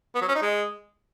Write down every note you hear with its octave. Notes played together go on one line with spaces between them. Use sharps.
B3
F#3
C#4
D#4
G#3